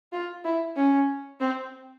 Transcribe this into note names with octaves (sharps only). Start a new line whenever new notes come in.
F4
E4
C#4
C4